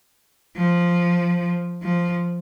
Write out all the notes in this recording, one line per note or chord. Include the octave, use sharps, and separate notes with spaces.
F3
F3